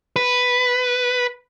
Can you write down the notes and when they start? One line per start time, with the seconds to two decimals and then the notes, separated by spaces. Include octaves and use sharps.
0.16 B4